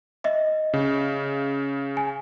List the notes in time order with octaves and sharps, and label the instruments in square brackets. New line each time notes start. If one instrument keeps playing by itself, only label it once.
[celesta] D#5 E5
[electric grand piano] C#3
[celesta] G#5